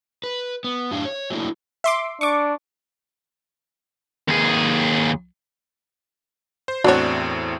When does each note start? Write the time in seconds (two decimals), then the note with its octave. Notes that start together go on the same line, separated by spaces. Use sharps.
0.24 B4
0.64 B3
0.91 F#2 A2 D4 G4 F5
1.05 C#5
1.30 F#3 A3 A#3 D4 E4
1.84 E5 C6 D6
2.21 D4 C#6 D6
4.28 D#2 G#4
6.68 C5
6.84 E2 A2 C4 D4 F#4 C#5 D5